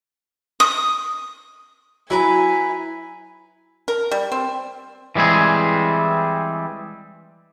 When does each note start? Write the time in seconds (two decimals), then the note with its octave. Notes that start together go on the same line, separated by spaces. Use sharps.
0.60 D#6
2.10 F#3 E4 B4 G#5 A#5
3.88 A#4
4.11 G3
4.32 C4
5.15 E3 G3 G#3 C4 G#4